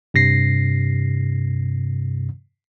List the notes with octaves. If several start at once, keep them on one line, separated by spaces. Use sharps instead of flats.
G2 C3 A#6 C7